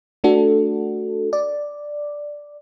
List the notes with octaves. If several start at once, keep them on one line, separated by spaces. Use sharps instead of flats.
A3 D4 F#4 A4
D5